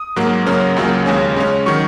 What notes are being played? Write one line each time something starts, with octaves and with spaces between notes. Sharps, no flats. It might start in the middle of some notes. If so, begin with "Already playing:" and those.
Already playing: D#6
G#2 F#3 A#3
F#2 C#3 F#3 A#3 C#4
C#2 C#3 F#3 A#3
D#2 C#3 G#3 C#4
C#3 G#3 C#4
D#3 F#3 C#6